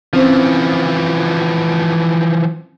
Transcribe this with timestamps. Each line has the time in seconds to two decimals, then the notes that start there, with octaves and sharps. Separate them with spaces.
0.13 E3 F3 C4 C#4 C5